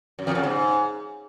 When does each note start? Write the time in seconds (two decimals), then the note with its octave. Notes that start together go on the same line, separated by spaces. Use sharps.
0.19 F#2
0.27 E2
0.35 C#3
0.43 G#2